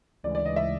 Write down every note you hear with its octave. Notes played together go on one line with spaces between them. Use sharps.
D2 C#3 E3 G#3 D5
D5
D#5
E5